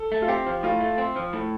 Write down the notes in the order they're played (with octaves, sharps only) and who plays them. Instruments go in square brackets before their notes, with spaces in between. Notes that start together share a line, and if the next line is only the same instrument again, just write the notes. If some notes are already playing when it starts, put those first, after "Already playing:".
Already playing: [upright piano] A4
[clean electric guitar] A3
[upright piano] F4
[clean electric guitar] C4 [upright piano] G4
[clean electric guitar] F3
[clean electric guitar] A2 [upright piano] F4
[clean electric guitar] A3
C4
F3
A2